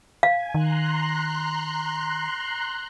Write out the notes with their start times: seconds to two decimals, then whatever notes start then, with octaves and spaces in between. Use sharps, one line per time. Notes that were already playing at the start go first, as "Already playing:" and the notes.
0.23 F5 G#5
0.55 D#3 A#5 C6 F#6